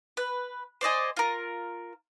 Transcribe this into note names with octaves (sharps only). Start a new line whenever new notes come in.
B4
C5 D5 D#5 G#5
F4 A#4